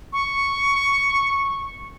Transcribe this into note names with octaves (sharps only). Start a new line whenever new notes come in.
C#6